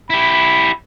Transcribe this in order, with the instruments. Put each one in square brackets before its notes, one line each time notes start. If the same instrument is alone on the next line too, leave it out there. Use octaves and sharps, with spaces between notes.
[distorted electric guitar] E4 G4 [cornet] B5